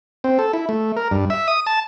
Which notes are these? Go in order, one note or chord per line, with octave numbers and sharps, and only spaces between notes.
C4
A4
E4
A3
A#4
G2
E5
D#6
A5